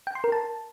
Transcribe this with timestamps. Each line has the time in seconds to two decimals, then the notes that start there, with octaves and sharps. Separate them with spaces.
0.07 G5
0.15 C6
0.24 A#4
0.32 A5